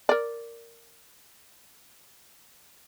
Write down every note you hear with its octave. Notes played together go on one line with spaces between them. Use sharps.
A#4 D5